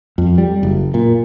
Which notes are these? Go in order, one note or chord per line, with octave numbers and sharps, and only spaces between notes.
F2
G3
F#1
A#2